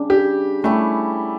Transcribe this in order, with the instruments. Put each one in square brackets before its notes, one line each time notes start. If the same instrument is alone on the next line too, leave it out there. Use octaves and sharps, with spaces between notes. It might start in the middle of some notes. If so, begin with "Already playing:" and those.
Already playing: [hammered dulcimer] C#3 G3 D4
[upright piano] G4
[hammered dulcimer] G3 C#4 E4 G4 [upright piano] A3